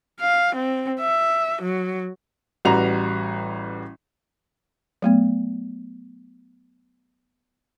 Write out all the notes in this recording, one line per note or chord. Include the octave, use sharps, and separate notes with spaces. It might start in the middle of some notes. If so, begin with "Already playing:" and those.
F5
C4
E5
F#3
A1 G3 F#4 B4 A#5 F7
F#3 A3 B3